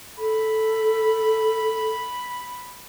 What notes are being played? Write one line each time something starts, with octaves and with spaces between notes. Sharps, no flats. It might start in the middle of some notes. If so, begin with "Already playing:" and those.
A4 B5